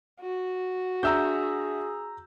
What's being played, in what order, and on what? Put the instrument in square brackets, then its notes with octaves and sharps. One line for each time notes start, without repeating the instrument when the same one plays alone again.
[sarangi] F#4
[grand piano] D4 E5 [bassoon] G#4 [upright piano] A#5 E6 G6